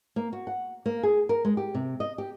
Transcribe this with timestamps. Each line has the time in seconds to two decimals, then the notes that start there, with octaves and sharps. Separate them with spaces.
0.16 A#3
0.33 F#4
0.47 F#5
0.86 A#3
1.03 G#4
1.29 A#4
1.45 G#3
1.57 G4
1.75 C3
2.00 D#5
2.18 G4